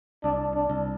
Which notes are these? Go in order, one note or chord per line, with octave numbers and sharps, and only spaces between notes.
C2 D4
D4
C2